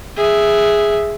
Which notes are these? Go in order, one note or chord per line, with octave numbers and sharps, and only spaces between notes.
G#4 E5